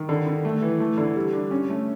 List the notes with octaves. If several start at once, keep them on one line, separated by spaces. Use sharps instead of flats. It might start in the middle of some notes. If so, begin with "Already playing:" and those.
Already playing: D#3
D3
D3
A3
E3
A3
D3
G3
D4
C#4
A3